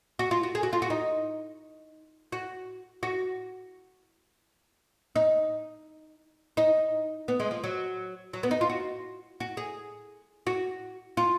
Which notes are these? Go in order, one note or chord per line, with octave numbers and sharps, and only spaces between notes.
F#4
F4
F#4
G#4
F#4
F4
F#4
D#4
F#4
F#4
D#4
D#4
B3
G#3
F3
F#3
F#3
B3
D#4
F4
F#4
F#4
G#4
F#4
F4